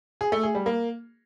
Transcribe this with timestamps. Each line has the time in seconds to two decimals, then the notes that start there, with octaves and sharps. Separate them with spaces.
0.21 G#4
0.32 A3
0.43 G#4
0.55 G3
0.66 A#3